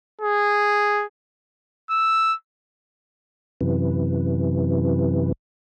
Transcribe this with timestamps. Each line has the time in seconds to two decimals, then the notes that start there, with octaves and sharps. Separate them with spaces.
0.21 G#4
1.90 E6
3.61 F#2 C3 E3